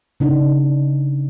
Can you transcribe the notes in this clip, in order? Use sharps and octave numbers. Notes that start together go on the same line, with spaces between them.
C#3 D4 D#4